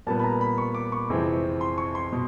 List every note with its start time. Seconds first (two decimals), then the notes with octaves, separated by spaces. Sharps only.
0.07 A#2 G3 B3 A5
0.19 B5
0.24 A#5
0.41 B5
0.58 C#6
0.75 D6
0.92 C#6
1.10 F2 C3 E3 G#3 C4
1.61 C6
1.78 C#6
1.95 C6
2.13 B2